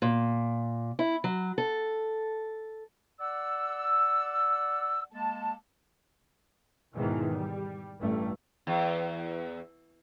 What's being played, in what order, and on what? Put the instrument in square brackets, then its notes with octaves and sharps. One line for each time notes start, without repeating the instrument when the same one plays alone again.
[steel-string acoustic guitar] A#2
E4
F#3
A4
[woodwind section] D5 F#5 E6
G#3 A#3 A5
[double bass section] E2 G#2 B2 D#3 E3
G3
A1 G2 A3
[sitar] E2